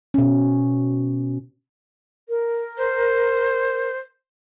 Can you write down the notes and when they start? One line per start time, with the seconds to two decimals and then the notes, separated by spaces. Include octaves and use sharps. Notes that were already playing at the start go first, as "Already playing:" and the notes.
0.14 B2 C#4
2.29 A#4
2.78 C5